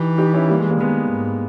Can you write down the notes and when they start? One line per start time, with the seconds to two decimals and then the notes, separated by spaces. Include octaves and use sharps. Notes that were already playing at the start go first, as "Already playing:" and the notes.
Already playing: E3 D#4 G4
0.18 D#4 G4
0.33 C#4 E4
0.49 G3 A#3
0.59 G#3
0.70 G3 A#3
0.80 D#3 G#3 B3
1.12 G#2